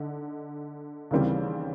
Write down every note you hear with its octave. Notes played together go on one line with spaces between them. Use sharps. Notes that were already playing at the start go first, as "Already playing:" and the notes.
Already playing: D3 D#4
D#2 C#3 E3 G3 C4